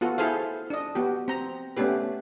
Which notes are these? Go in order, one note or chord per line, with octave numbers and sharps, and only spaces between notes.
B3 F4 F#4 A4
E4 G#4 A4 C5 F5
D4 D#5
B3 F#4 G4
C4 A#5
A3 B3 C#4 D4 G4 B4